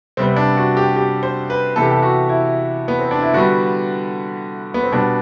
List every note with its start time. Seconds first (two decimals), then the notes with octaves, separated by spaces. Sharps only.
0.17 C3 G3 B3 C4
0.36 D4
0.57 F#4
0.77 G4
0.96 G4
1.23 C5
1.50 B4
1.76 C3 E3 B3 A4
1.83 G4
1.92 A4
2.02 F#4
2.29 E4
2.88 B3
2.99 C4
3.11 D4
3.22 E4
3.33 D3 G3 B3 F#4
4.74 B3
4.83 C4
4.92 B2 G3 B3 D4